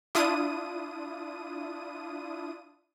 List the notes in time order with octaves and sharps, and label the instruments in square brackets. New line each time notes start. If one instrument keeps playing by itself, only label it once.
[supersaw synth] D4 E4 F4 D#6 D#7